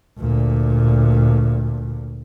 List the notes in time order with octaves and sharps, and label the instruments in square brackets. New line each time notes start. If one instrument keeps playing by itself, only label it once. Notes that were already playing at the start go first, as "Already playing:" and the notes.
[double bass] D2 A#2